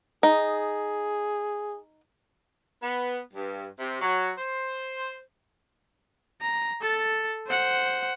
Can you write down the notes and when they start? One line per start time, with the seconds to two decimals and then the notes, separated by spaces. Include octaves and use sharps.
0.23 D#4 G#4
2.83 B3
3.34 G2
3.80 C3
4.01 F#3
4.37 C5
6.41 A#5
6.81 A4 A6
7.47 C5 F#5